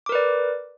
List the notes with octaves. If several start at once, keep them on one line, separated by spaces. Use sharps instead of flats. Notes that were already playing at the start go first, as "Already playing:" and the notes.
A#4 B4 D5 D6